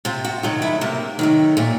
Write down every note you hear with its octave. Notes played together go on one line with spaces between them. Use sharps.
C3 F4
F#4
D#3 F#3 A3 F4
E4
C3 A#3
D#3 F#3 A3
A#2 A3